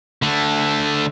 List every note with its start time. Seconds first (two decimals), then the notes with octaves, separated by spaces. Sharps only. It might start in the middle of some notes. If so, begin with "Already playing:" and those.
0.22 D3 A3